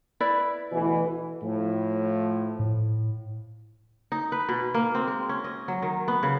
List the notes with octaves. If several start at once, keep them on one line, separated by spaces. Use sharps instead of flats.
E4 B4 D5
D2 B2 E3
A2 F3
A2
D#4
B4
B2
A#3
C4
G#3
C#4
D#5
F#3
D#3
B3
C#3